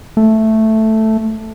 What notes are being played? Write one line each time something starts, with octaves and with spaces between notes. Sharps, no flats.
A3